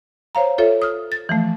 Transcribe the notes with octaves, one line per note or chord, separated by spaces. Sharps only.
C5 C#5 F5 A#5
F4 A4 C#5 E5
D#6 F6
A6
E3 F3 A3